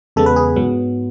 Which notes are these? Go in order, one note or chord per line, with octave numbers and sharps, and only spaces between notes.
E2 C#3 G#3 B3 A4
B4
G#4
G#2 F#3 B3